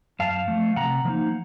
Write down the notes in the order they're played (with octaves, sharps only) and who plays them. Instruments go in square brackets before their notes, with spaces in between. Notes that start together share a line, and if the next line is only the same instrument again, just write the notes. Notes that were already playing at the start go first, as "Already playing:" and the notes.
[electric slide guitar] F#2 F5 A5
F3 A3
C3 F#5 A#5
F3 A#3 D#4